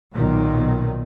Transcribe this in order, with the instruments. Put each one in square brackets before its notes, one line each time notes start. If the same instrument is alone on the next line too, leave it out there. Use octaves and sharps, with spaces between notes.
[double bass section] B1 A#2 D#3